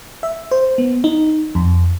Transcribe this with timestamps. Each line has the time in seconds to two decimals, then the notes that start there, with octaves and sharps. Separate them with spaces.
0.23 E5
0.51 C5
0.78 B3
1.04 D#4
1.55 F2